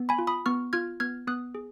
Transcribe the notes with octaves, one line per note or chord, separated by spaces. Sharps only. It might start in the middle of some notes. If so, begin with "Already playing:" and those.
Already playing: B3
G#5 B5
F4
B5 D#6
B3 C#6 F6
F4 F6 G#6
B3 F6 G#6
B3 D#6 F#6
G#4